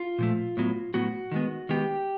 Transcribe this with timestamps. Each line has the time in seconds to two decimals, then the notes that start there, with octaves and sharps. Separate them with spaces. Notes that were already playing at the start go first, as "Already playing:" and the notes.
Already playing: F4
0.19 A#2 F3 A3
0.57 A2 F#3 B3
0.94 A2 F#3 B3 F#4
1.32 D#3 G#3 B3
1.69 D#3 G#3 B3 G4